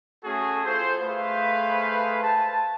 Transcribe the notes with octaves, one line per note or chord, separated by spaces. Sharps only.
A3 C#4 F#4 G#4 A4
F4 A4 C5
A3 G#4 B4 C5 F5
A5